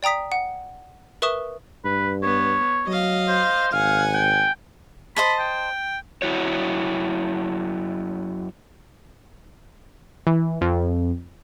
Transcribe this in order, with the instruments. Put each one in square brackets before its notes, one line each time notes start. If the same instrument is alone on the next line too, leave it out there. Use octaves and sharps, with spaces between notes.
[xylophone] D5 G5 A#5 D#6 B6
F#5
A#4 B4 E5 C#6 D#6 E7
[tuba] G2 [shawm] B4
[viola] B3 [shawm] C#5
[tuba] F#3 [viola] D#5 F5
[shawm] C5
[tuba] G#1 [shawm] F5 [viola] F#5 G#5
[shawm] G5
[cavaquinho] C5 D#5 A5 [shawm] B5
[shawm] G5
[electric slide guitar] F#2 E4 F#4 C#5
[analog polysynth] E3
F2